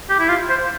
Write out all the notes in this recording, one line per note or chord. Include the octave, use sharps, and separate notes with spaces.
G4
E4
F4
C5